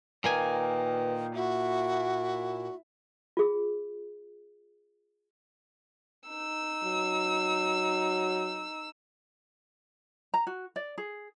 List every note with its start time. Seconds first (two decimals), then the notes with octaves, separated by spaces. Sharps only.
0.24 A#2 D#3 A#3 B4 G#5
1.35 E4 F#4 E5
3.37 F4 G#4
6.29 D#4 E6
6.84 F#3
10.34 A#5
10.47 F#4
10.76 D5
10.98 G#4